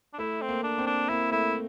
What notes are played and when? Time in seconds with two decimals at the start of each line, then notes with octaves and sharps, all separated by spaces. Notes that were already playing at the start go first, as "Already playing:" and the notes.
0.14 D4
0.18 A3 E4
0.42 C4
0.49 A#3
0.64 D4
0.78 C4
0.87 D4
1.09 A#3 E4
1.31 A3 E4